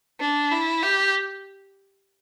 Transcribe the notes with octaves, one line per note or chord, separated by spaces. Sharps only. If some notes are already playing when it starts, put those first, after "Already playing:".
D4
E4
G4